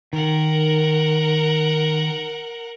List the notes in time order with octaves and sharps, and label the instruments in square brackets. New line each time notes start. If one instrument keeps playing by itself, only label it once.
[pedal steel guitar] D#3 [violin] A#4 F#5